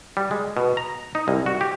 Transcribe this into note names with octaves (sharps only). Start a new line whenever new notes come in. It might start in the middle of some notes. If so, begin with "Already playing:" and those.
G3
G#3
B2
A#5
D#4
C2
F#4
G4